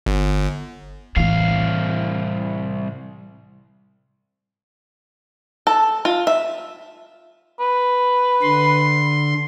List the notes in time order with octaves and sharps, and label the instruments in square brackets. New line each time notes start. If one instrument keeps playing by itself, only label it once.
[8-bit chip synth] G1
[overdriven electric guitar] C2 F5 [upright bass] A2 E3
[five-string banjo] A4
F4
E5
[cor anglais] B4
[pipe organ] D3 C6